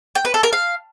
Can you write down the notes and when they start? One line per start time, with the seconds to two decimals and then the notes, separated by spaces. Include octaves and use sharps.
0.15 G5
0.25 B4
0.34 A4
0.43 A#4
0.53 F5